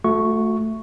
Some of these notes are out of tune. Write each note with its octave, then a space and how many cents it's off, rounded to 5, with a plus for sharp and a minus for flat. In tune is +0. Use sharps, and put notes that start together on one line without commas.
A3 +0 F#4 -40 C#6 +0